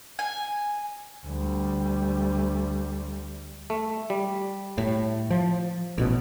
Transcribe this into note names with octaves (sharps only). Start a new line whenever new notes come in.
G#5
D2 G3
A3
G3
A2
F3
A1 B2